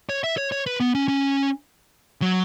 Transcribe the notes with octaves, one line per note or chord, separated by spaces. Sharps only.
C#5
E5
C#5
C#5
B4
B3
C#4
C#4
F#3